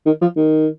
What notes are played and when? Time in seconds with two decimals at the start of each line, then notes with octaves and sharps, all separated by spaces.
0.06 D#3
0.21 F3
0.37 D#3